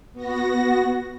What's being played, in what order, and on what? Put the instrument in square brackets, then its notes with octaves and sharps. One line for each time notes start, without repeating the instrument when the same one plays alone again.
[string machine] B3 F#4 A#6